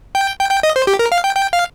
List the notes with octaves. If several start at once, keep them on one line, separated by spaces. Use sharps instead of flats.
G5
G5
G5
D#5
C5
G4
A#4
F5
G5
G5
F5